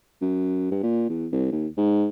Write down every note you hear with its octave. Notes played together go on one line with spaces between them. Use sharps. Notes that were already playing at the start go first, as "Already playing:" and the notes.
F#2
G2
A#2
E2
C2
D#2
G#2